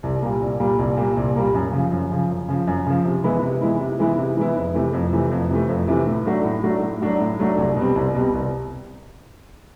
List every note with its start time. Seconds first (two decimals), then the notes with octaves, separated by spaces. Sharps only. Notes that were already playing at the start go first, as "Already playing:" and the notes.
0.03 C2
0.22 A#2 G3 A#3
0.41 C2
0.60 A#2 G3 A#3
0.79 C2
0.97 A#2 G3 A#3
1.17 C2
1.35 A#2 G3 A#3
1.54 F#2
1.73 C#3 F3
1.92 F#2
2.11 C#3 F3
2.30 F#2
2.49 C#3 F3
2.67 F#2
2.86 C#3 F3
3.05 C3
3.24 E3 G#3 B3 E4
3.43 C3
3.61 E3 G#3 B3 E4
3.81 C3
3.99 E3 G#3 B3 E4
4.18 C3
4.37 E3 G#3 B3 E4
4.56 F2
4.74 C3 E3 A3
4.93 F2
5.13 C3 E3 A3
5.31 F2
5.50 C3 E3 A3
5.69 F2
5.88 C3 E3 A3
6.07 A2
6.26 F#3 A3 D4 F#4
6.45 A2
6.63 F#3 A3 D4 F#4
6.82 A2
7.01 F#3 A3 D4 F#4
7.20 A2
7.39 F#3 A3 D4 F#4
7.58 C2
7.76 B2 G3 C4
7.96 C2
8.15 B2 G3 C4
8.33 C2